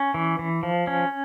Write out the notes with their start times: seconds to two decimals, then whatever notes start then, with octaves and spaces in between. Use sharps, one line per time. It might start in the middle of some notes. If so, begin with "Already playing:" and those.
Already playing: C#4
0.14 E3
0.39 E3
0.63 F3
0.87 C#4